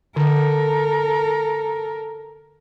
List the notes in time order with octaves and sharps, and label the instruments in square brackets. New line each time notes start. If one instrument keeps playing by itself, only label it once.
[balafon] D3 [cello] A4 A#4